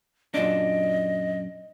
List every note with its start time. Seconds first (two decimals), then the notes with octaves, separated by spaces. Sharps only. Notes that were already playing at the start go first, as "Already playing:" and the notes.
0.34 F#2 A#2 D4 D#5